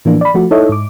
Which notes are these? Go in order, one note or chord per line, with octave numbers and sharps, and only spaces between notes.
A2 E3 F3 A#3 D4
D5 B5
F3 A3 F#4
D#4 E4 A4 C#5 D#5 E5
G#2 D6